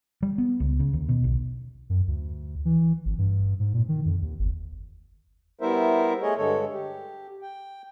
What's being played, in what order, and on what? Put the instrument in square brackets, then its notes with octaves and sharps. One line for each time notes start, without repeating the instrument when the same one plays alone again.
[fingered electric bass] G3
B3
C#2
C#3
D#2
B2
B1
[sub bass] F#2
D2
E3
G#1
G2
G#2
A#2
D#3
F2
D#2
G1
[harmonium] G3 B3 E4 A#4 C5 E5
A3 G#4 C#5 D#5
G2 D3 G#3 A4 C#5
G4
G5